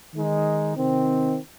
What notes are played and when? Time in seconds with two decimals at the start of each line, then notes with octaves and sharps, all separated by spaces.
0.13 D#3 G#3 D#4
0.75 C3 D#3 C4